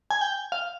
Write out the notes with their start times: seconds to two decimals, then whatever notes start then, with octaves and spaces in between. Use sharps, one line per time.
0.11 G#5
0.21 G5
0.52 F5